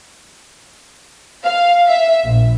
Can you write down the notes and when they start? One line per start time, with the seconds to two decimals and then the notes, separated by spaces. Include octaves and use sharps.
1.43 F5
1.87 E5
2.24 A#1